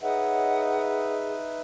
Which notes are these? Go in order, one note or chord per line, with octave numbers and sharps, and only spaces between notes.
D#4 G#4 B4 C#5 D#5 E5 F#5